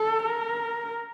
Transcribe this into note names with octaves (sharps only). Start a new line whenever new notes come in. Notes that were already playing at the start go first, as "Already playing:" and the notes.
Already playing: A4
A#4